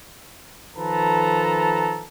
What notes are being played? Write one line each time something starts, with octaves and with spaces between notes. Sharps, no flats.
D#3 F3 A4 B4 A5 A#5